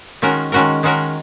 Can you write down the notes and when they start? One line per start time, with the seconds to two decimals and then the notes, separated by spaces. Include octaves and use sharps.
0.22 D#3 G#3 C#4 F#4 A#4
0.52 D#3 G#3 C#4 F#4 A#4
0.83 D#3 G#3 C#4 F#4 A#4